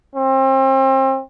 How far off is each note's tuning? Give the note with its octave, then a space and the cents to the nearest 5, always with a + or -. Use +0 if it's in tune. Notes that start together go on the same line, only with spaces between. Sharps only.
C4 +35